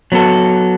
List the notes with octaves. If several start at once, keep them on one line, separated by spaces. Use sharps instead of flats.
F#3 B3 F#4 A4